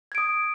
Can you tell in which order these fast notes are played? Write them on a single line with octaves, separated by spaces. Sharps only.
G#6 D7 D#6